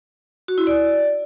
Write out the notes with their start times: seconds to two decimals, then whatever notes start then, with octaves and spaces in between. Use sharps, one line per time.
0.48 F#4
0.58 E4
0.67 D5